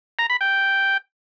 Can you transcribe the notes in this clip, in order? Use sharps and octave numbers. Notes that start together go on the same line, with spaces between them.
A#5
B5
G5